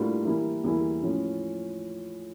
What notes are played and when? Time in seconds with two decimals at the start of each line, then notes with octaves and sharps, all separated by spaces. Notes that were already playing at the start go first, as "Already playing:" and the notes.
Already playing: A2 G3 A#3 D4 F4
0.25 E3 G3 A#3 E4
0.64 E2 E3 G3 A#3 E4
1.02 A2 F3 C#4